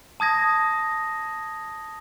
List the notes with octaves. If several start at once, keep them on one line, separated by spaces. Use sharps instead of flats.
A5 D#6 G#6 A#6